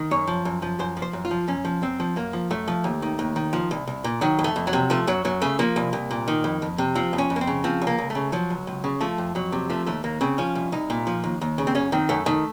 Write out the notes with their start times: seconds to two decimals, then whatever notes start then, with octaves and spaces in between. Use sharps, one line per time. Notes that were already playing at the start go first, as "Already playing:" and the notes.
Already playing: D#3
0.11 F#2 C#5
0.27 F3
0.45 F#2
0.62 F3
0.79 F#2 C5
0.97 F3
1.02 C5
1.13 F#2
1.25 F4
1.31 F3
1.48 F#2 C#4
1.65 F3
1.82 F#2 C4
2.00 F3
2.16 F#2 A#3
2.33 F3
2.50 F#2 A3
2.68 F3
2.84 D#2
3.02 D#3
3.19 D#2
3.36 D#3
3.53 F3
3.71 C2
3.87 C2
4.04 A#2
4.21 D#3 F#3
4.39 F2
4.44 A3
4.56 F2
4.67 F#3
4.73 C3
4.90 F3 A3
5.07 F#2 F#3
5.25 F#2 F#3
5.42 C#3 A3
5.59 F3 A#3
5.76 C2
5.93 C2
6.11 A#2
6.28 D#3
6.44 F2
6.62 F2
6.78 C3
6.95 F3 C4
7.13 F2
7.18 C#4
7.30 F2
7.36 A#3
7.41 C4
7.47 C#3
7.64 F3 C4
7.82 C#2
7.87 A#3
7.98 C#2
8.10 A3
8.15 C#3
8.32 F3 F#3
8.50 C#2
8.67 C#2
8.84 C#3
9.01 F3 A3
9.18 F2
9.35 F2 F#3
9.52 C3
9.70 F3 A3
9.86 D#2 A3
10.04 D#2 A#3
10.21 C#3 C4
10.38 F3 C#4
10.55 C2
10.72 C2 D#4
10.90 A#2
11.07 F3
11.24 D#2
11.41 D#2
11.58 C#3
11.67 C4
11.75 F#2 C#4
11.92 D#3 C4
12.09 F#2 A3
12.26 D#3 A3